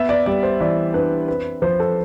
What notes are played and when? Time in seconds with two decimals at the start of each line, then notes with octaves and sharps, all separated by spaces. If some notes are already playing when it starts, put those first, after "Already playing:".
Already playing: B3 E5
0.09 D5
0.26 G3 D5
0.43 C5
0.60 E3 D5
0.94 D4 B4
1.28 C4 B4
1.62 F3 C5
1.80 A4